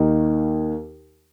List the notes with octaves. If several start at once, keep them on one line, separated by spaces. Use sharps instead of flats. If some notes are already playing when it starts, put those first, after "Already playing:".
Already playing: D#2 D#3 A#3 D#4